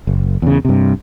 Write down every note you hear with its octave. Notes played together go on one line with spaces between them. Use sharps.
F#1
E2 C#3
G2 C3